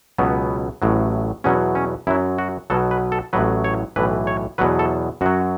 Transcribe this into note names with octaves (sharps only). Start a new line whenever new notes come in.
C#2 B2 F#3 B3
A1 A2 F#3
E2 B2 F#3 C#4
C#4
F#2 F#3 E4
F#4
B1 B2 F#3 A4
B4
A4
A1 A2 F#3 B4
C#5
B1 A2 E3 B4
C#5
E2 B2 F#3 B4
A4
F#2 F#3 F#4